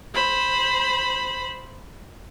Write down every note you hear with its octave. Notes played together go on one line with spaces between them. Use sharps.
C5 B5